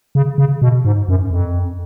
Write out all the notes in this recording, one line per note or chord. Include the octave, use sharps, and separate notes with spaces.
C#3
C#3
B2
G#2
F#2
F2